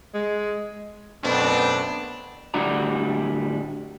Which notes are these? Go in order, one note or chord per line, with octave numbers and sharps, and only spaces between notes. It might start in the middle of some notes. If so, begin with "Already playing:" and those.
G#3
F#2 B2 A3 B3 C4 D4
D2 A2 G3 D4 F#4 A#5